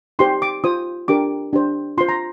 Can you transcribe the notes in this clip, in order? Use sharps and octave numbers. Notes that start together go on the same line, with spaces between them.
D#4 G4 C5 C6
D6
F4 C5 D#6
D4 G4 A#4 D6
D4 G4 C5
F4 C5 C6
A#5